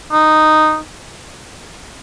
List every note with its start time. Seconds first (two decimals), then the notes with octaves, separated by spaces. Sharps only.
0.12 D#4